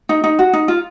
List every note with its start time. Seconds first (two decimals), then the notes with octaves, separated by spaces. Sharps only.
0.09 D#4
0.24 D#4
0.39 F#4
0.53 D#4
0.68 F4